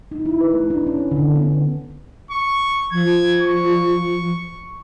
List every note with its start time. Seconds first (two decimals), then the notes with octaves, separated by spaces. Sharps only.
0.11 D#4
0.26 E4
0.41 B4
0.54 A3
0.70 D4
0.87 C#4
1.11 D3
1.36 B3
2.30 C#6
2.92 F3 G#6
3.42 C#6